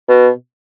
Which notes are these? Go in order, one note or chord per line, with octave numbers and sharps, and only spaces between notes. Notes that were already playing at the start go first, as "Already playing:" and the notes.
B2